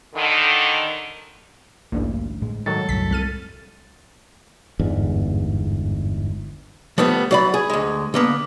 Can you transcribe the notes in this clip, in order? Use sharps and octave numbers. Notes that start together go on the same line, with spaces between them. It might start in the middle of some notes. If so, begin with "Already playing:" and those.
D3 D#3
A1 D2 G2 A#3
A2 G#3
D#3 F#3 A4
C2 F#2 A2 B6
C2 G#3 F6 D#7
G1 E2 G#2
F3 G3 A3 B3
F#3 D5 B5
G#4
D2 G#3
D3 A#3 B3